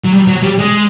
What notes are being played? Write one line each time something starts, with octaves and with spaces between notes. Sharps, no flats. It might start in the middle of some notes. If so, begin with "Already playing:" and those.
F#3
G3
F#3
G3
G#3